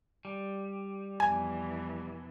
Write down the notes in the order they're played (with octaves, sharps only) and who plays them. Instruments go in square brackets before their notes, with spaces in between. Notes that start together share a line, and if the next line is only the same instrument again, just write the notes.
[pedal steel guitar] G3
[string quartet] F2 B2 E3 [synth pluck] G#5